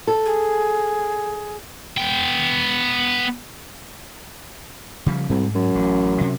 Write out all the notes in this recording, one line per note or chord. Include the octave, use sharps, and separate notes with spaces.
A4
G#4
B3 G5
C#3 F3 G3
C2 G#2
F#2
A1
C3